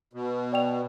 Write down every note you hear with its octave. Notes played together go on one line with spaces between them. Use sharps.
B2
D5 G5 F7